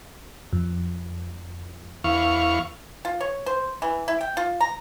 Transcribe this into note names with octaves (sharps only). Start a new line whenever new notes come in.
F2
E2 F5 C#6
F4
C#5
C5
E3
E4
G5
F4
A#5